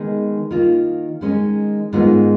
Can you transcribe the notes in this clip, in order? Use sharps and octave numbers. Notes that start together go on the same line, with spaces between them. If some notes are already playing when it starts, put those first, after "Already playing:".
Already playing: D#3 G#3 B3 D#4 G#4
D#3 A#3 F4
D#3 G#3 C#4
G#2 D#3 G#3 B3 F4